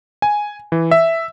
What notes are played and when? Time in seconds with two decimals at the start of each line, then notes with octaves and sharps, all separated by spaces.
0.22 G#5
0.72 E3
0.91 E5